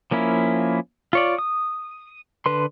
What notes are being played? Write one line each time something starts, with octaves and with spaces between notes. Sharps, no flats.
F3 A#3 C#4 E4
F4 C#5 D5
D#6
D3 B4 C6